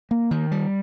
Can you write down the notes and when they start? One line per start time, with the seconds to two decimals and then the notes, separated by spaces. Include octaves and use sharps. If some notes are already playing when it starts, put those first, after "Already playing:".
0.11 A#3
0.31 D#3
0.52 G3